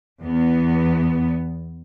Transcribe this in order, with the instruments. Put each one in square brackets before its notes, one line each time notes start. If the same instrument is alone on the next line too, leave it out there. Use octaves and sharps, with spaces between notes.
[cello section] E2 B3